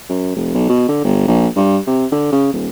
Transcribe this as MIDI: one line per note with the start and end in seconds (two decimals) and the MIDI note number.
0.09 0.32 42
0.36 0.51 29
0.54 0.68 35
0.69 0.88 47
0.88 1.01 50
1.04 1.26 31
1.28 1.48 34
1.56 1.79 43
1.87 2.06 48
2.12 2.31 50
2.32 2.50 49
2.53 2.68 27